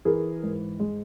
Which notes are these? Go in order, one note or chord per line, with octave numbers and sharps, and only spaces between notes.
E3 G#4 A#4
G#2
G#3